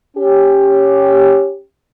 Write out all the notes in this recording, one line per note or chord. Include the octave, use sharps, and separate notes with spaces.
C#4 G4